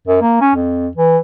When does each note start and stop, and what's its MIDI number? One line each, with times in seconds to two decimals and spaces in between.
0.07 0.20 42
0.21 0.36 58
0.41 0.53 61
0.55 0.88 41
0.97 1.18 52